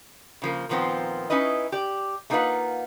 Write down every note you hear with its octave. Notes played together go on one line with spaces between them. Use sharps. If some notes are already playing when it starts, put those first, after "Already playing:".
C#3 F3 A#3
A#2 D#3 F3 B3 C4
C#4 D#4 E4 B4 D#5
G4 D5
A3 A#3 D#4 F4 B4 F#5